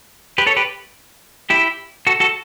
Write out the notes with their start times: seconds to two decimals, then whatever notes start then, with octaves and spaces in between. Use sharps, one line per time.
0.38 G4 B4
0.47 A4 C#5
0.56 G4 B4
1.50 E4 G4
2.07 F#4 A4
2.20 F#4 A4